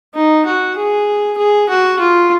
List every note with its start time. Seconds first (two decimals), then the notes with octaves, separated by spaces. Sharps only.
0.15 D#4
0.46 F#4
0.77 G#4
1.37 G#4
1.69 F#4
1.99 F4